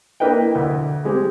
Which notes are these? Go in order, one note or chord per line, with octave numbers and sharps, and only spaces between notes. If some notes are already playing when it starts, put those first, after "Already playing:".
A#3 D4 E4 B4 D#5 G5
D2
G3 G#3 C4 G4